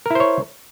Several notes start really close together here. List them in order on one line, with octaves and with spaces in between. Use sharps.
A#4 E4 C5 C#5